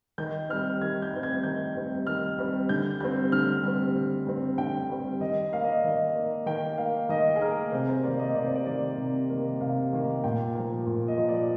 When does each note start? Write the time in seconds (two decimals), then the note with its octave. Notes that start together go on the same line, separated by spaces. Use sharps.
0.18 D#3 G6
0.49 G3 C4 F6
0.81 D#3 G#6
1.02 G6
1.13 G3 C4
1.23 G#6
1.43 D#3 G6
1.75 G3 C4
2.07 D#3 F6
2.39 G3 C4
2.69 D3 G6
3.01 G3 C4 G6
3.32 D3 F6
3.63 G3 C4
3.95 D3
4.27 G3 C4
4.58 D3 G5
4.90 G3 C4
5.20 D#3 D#5
5.52 A#3 F5
5.64 D#5
5.75 D5
5.84 D#3 D#5
6.15 A#3
6.46 D#3 G5
6.78 A#3 F5
7.09 D#3 D#5
7.36 G#4
7.41 A#3 A#4
7.72 C3 C5
7.88 C5
8.03 D#3 A#3 D5
8.19 D#5
8.35 C3 D5
8.45 C5
8.56 D5
8.66 D#3 A#3 D5
8.98 C3
9.29 D#3 A#3
9.61 C3 F5
9.93 D#3 A#3
10.24 A#2 G5
10.55 F3 A#3
10.87 A#2
11.08 D#5
11.18 F3 A#3
11.29 D5